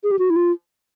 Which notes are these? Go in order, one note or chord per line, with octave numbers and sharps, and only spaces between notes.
G#4
G4
F#4
E4
F4